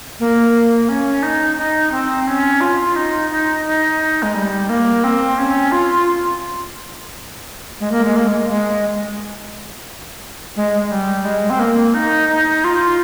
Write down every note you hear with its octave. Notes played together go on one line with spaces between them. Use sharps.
A#3
C#4
D#4
D#4
C4
C#4
F4
D#4
D#4
D#4
G#3
G3
A#3
C4
C#4
F4
G#3
A#3
G#3
A#3
G#3
G#3
G#3
G3
G#3
C4
A#3
D#4
D#4
F4